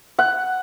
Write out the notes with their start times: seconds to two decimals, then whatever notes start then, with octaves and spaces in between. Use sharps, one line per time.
0.19 F#5